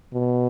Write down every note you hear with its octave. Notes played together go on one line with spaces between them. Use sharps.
B2